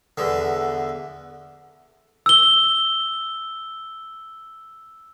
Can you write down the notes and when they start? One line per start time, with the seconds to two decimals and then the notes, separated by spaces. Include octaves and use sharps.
0.18 E2 D3
2.26 E6 G7